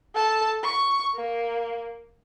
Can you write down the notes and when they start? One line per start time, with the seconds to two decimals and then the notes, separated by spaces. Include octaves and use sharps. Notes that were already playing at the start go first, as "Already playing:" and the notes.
0.15 A4 A5
0.63 C#6
1.15 A#3